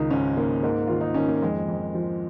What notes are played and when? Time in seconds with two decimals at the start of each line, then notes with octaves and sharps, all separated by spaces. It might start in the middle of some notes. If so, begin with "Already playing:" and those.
Already playing: C#2 D#3 D#4
0.11 G#2 C#4
0.37 G#2 A#3
0.63 G#2 A#3
0.87 D#3 F4
1.01 D#4
1.14 D#3 C#4
1.28 A#3
1.42 F2 G#3
1.68 F2
1.95 F3